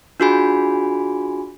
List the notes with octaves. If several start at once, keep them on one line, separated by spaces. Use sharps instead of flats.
D4 F4 F#4 G#4 G#5 B5